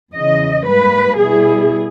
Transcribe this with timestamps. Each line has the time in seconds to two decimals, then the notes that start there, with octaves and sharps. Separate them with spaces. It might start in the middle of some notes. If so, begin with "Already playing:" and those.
0.13 E2 C#3 E3 D#5
0.66 G#2 G3 A#3 B4
1.18 B2 G3 B3 E4 G#4